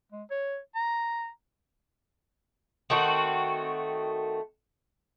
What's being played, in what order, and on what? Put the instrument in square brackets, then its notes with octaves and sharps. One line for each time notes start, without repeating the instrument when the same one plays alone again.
[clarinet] G#3
C#5
A#5
[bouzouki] D#3 A3 C4 F#4